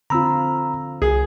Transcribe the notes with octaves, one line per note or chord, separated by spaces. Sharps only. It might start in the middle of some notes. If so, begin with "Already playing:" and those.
D3 C4 F4 A#5 B5 E6
C2 G#4